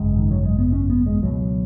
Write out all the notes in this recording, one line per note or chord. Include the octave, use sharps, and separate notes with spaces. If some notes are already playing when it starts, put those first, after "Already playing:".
Already playing: G#1 F#2 C#3 G#3
D#3
F#3
G#3
B3
C#4
B3
G#3
C#2 B2 F#3